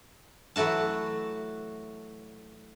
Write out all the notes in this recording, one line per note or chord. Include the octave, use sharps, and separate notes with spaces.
E3 F#3 A3 F#4 A5